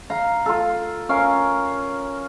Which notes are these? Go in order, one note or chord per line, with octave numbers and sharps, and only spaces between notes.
F5 A#5
F4 A4
C#4 A#4 F5